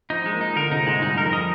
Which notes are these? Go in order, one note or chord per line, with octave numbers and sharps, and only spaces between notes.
F3 D#4
G#3
A#3
D#4
D3 A#4
C3 D#4
G#2 G#3
G2 D#4
A#4
F2
D#5